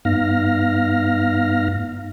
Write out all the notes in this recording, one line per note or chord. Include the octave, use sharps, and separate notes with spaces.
G2 B3 D#4 F5 F6 A#6